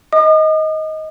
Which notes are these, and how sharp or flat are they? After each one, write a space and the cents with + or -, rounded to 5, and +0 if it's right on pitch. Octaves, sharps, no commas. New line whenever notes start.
D#5 +15 D#6 -45